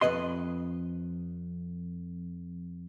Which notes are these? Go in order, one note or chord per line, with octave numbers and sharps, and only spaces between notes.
F2 C3 B4 D#5 C6